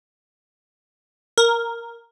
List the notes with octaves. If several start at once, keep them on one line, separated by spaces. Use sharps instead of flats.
A#4